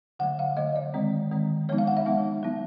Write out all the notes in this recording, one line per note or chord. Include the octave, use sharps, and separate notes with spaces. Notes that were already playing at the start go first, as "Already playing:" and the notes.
D3 F#3 A3 F#5
F5
D3 F#3 A3 D#5
D5
D#3 G#3 C4
D#3 G#3 C4
F3 G#3 B3 D#4 C#5
F5
F#5
E5
F3 G#3 B3 D#4
F#3 B3 E4